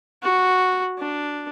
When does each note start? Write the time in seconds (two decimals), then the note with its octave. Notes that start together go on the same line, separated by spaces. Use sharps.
0.23 F#4
0.99 D4